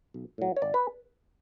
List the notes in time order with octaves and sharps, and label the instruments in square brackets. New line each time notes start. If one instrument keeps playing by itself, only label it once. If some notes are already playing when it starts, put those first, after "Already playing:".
[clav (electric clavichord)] B1
A2 F#3
C#5
G#1 D5
B4